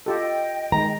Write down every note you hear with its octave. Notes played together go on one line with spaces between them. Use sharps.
F4 G4 A4 D#5 G5
D#3 G#3 A#5